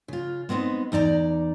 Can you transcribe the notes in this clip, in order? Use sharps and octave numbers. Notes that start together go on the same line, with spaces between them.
C#3 F4
G#3 B3 C4 D4 D#4
E2 D#4 D5 A5 A#5